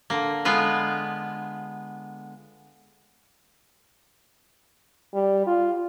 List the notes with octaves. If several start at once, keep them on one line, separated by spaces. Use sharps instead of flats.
D3 A#3
D3 G#3 B3 F4 B4
G3
F4